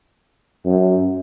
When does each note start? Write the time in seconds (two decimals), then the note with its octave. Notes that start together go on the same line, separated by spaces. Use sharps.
0.65 F#2